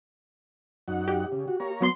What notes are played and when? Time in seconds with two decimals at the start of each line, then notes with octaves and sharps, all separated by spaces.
0.88 F#2 D#4 F#5
1.08 G4
1.32 C#3
1.48 F#4
1.60 A#3 C#5 A#5
1.80 F#3 B3 C6